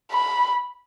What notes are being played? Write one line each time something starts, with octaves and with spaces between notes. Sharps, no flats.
B5